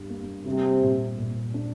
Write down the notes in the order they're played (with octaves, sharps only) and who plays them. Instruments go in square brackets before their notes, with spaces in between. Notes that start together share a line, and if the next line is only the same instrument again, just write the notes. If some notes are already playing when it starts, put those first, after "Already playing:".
Already playing: [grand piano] G2 G4
A#3
[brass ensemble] C3 [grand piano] G3
[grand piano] A#2
A#2
D4